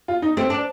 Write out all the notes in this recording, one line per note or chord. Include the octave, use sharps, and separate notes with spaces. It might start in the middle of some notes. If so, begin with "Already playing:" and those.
F4
D#4
A3 C4
D4